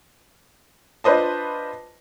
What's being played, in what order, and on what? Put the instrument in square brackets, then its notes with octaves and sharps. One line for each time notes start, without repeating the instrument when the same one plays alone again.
[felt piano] D4 F4 B4 C5 D#5 A5